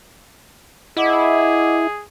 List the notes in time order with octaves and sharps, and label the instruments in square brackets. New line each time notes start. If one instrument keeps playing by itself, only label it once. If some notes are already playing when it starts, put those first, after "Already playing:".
[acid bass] E4 [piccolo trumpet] G#4 [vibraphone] D#5 F#5 D6